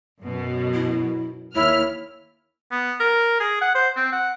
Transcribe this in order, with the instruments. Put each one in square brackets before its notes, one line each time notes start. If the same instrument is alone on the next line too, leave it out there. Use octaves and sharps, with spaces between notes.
[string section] F#2 B2
[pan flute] E4
[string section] D#2 F6 [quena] E4 [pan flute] C#5
[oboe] B3
A#4
G#4
F#5
C5
C4
F#5